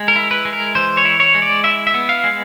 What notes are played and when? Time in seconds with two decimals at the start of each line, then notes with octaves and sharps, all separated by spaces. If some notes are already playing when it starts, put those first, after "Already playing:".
Already playing: G#3
0.08 A#4
0.16 E4
0.31 B4
0.45 G#3
0.53 A#4
0.75 E3 C5
0.97 C#5
1.05 E4
1.20 C#5
1.35 G#3
1.42 D5
1.64 E4 E5
1.87 E5
1.94 B3
2.09 F5
2.24 G#3